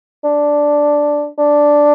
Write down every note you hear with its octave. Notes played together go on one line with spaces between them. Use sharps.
D4
D4